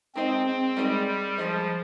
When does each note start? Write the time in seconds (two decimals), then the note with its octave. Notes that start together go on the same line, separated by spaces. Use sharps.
0.15 G#3 C4 D#4 G#4 C5 D#5
0.46 C4
0.76 G3 G#3 D#4 G#4 C5 D#5
1.07 G3
1.38 F3 G#3 D#4 G#4 C5 D#5